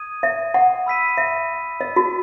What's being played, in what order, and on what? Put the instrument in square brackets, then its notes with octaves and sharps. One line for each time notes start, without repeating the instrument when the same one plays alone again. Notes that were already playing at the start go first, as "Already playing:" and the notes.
Already playing: [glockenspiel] D#6 G#6 D#7
[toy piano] E5
F#5
[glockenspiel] B5 E6 B6 D#7
[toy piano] E5
D#5
F#4